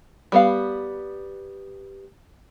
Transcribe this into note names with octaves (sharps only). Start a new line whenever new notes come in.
G3 B3 F5